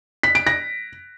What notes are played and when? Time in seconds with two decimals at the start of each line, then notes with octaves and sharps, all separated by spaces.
0.23 B6
0.35 D7
0.47 A#6